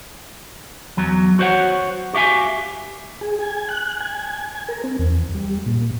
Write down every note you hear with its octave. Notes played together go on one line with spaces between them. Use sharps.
E2 F#3
F#4 C5 C#5 F#5
F#4 G4 E5 F5 G#5
G#4
G#5
F#6
G#5
G#5
A#4
C4
E2
G3
A#2